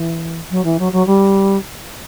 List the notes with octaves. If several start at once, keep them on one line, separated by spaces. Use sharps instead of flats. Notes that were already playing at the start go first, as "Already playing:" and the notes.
Already playing: E3
F#3
E3
F#3
F#3
G3